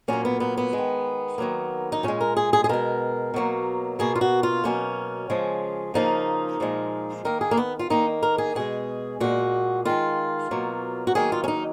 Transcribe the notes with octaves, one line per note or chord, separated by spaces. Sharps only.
A#2 F#3 A#3 C#4
B3
B3
B3
G#3
D#3
D#3 F#3 A#3
D#4
A#2 G#3 C#4
A#4
G#4
G#4
G#4
B2 G#3 A#4
B2 F#3 A#3
B2 A#3 G#4
F4
F#4
F4
B2 F#3 A#3 C#4
C#3 F3 G#3
C#3 F3 A#3 D#4
A#2 F3 G#3
D#3 A#3 A#4
G#4
A#3
B3
F4
D#3 A#3 D#4
A#4
G#4
B2 G#3 G#4
A#2 G#3 F#4
D#3 G#3 F4
B2 F#3 A#3
F#4
D#3 F#3 A#3 G#4
F4
C#4
D#4